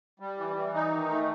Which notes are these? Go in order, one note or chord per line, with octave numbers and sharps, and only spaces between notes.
G3
E3
E3
D#4
D#3
A3